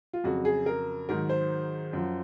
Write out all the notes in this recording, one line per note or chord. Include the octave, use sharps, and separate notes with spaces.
F4
F2 C#3 F#3 F#4
G#4
A#4
G#2 D#3 F#3 A#4
C5
F#2 F3